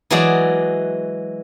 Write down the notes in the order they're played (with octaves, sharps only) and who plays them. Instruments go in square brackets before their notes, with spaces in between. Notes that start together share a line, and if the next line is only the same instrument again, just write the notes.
[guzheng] E3 F#3 G#3 F#4 G#4 D5